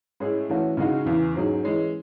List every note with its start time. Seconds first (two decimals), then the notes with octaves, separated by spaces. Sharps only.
0.20 A2 G#3 C#4 E4 G#4
0.49 E3 A3 C#4 F#4
0.77 C#3 G#3 D#4 F#4
1.06 E2 C#3 E3
1.35 G#2 F#3 C#4 G#4
1.63 E3 G#3 C#4